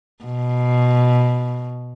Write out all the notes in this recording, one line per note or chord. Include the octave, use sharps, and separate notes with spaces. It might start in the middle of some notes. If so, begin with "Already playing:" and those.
B2